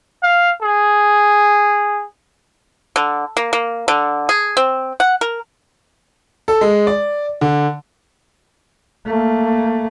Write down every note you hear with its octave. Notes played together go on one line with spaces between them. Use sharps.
F5
G#4
D3
A#3
A#3
D3
G#4
C4
F#5
A#4
A4
G#3
D5
D3
A3 A#3